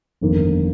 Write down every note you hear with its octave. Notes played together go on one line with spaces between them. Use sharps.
G1 F2 D#3 A#3